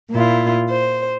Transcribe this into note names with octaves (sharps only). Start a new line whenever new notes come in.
A#2 E4 F4
C5